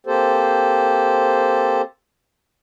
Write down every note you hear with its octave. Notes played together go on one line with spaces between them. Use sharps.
A#3 C4 G4 A4 C5